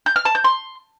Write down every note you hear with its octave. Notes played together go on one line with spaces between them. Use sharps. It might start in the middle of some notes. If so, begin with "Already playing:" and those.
G6
F6
A5
G6
C6